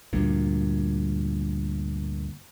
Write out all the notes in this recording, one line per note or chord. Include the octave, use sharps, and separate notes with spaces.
D2 G2 A#2